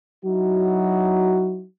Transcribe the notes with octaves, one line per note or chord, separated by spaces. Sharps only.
F#3 D#4 E4 F#4